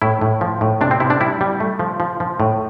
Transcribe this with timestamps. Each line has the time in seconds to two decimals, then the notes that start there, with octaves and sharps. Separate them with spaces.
0.02 A2 E4
0.21 A2
0.41 F3
0.61 A2
0.81 C3 D4
0.91 C4
1.00 C3 E4
1.10 D4
1.20 G3 E4
1.41 G3
1.60 A3
1.79 F3
2.00 F3
2.20 F3
2.40 A2